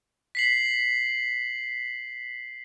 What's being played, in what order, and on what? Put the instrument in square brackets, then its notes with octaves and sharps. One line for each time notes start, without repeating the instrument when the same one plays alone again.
[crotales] B6 C7 F#7